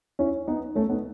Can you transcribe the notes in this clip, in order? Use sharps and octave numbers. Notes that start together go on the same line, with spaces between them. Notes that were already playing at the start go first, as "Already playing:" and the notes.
C#4 E4
B3 D#4
A3 C#4
B3 D#4